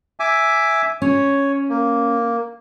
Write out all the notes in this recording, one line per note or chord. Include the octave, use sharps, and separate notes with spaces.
E5 G#5 D6
C#4 C#5
A#3